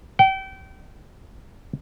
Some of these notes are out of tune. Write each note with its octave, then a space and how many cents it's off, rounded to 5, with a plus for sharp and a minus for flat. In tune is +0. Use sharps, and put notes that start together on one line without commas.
G5 -30